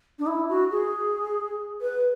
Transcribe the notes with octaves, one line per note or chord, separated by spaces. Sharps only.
D4
E4
F#4
G#4
B4